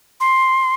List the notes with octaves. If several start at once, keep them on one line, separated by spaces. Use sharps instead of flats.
C6